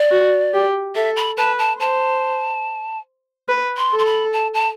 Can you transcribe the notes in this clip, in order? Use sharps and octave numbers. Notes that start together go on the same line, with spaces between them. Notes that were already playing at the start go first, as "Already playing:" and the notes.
Already playing: D5
F#4
G4
A4 E5
B5
B4 A5
A5
C5 A5
B4
C6
A4
C6
B5
A5
A5